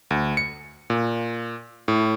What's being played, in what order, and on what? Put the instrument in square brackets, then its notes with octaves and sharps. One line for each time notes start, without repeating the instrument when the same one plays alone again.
[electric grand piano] D2
C#7
A#2
A2